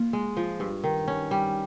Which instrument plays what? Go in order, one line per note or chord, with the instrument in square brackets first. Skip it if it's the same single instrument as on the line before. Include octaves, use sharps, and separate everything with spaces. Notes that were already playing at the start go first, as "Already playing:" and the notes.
Already playing: [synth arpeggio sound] A#3 [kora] F4
[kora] G#3
F3
G2
D#3
C#4
G3